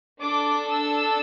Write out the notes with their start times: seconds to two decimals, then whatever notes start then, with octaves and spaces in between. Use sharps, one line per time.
0.21 D4 A4 D6
0.71 E6